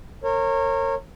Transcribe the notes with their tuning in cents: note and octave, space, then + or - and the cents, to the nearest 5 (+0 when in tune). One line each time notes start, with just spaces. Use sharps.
A#4 -25 C#5 -25